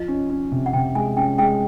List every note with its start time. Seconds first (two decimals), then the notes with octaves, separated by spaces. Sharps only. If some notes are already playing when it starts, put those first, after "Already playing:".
Already playing: F3 D#5
0.08 C#4
0.30 C#4
0.52 C3
0.66 F#5
0.73 C3 G5
0.95 G#3 G#5
1.17 C#4 G5
1.38 G#3 G5